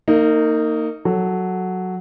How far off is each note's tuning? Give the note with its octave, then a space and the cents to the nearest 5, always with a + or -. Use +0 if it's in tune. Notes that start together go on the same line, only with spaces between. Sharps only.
A#3 -30 D#4 +0
F#3 +0 A4 +0